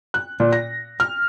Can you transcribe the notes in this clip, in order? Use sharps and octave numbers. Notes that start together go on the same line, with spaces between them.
F#6
A#2
A#6
F6